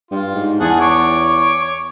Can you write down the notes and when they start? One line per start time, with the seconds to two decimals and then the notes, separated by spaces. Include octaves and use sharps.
0.11 G2 F4
0.35 G#2
0.60 E2 G#4 F#5 A5
0.81 C#5 D6